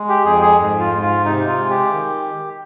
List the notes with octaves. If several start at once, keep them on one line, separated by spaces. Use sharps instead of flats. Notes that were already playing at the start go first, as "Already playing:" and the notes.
Already playing: G#3
G4
F2 G#4
G#4
G#2
F4
G#2
F4
C3 D#4
F4
G#3
G4
D#3